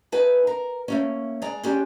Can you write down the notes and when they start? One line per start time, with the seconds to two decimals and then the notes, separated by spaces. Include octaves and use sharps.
0.12 A3 D#4 B4 G#5
0.47 A#4
0.88 A3 A#3 C#4
1.42 G#3 D5 A#5
1.64 G#3 C#4 D4 G4